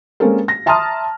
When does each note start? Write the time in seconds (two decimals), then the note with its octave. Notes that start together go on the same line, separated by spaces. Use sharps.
0.20 G#3 A#3 C4 C#4 A4 A#4
0.48 A#6
0.66 E5 A5 A#5 C6 D#6 F6